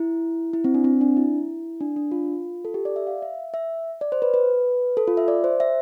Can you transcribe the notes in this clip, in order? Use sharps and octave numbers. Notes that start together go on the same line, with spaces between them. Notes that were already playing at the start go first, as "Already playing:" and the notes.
Already playing: E4
E4
C4
D4
C4
D4
E4
D4
D4
F4
A4
G4
D5
E5
F5
E5
E5
D5
C5
B4
B4
A4
F4
E5
D5
C5
E5